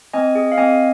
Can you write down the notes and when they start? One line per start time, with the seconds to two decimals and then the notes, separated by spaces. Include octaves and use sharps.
0.13 C4 D#5 G#5
0.35 G#4
0.52 F5
0.57 C4 D#5 G#5